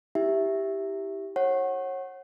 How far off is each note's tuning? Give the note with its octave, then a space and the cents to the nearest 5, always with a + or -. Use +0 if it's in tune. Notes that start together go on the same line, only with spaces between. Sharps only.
E4 -20 G4 +0 E5 +0
C#5 -30 F#5 +0